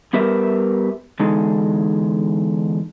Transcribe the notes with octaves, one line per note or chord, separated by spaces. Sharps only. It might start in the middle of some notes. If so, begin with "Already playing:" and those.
G3 B3 G4 A#4 B4 E5
E2 D3 G#3 D#4 A4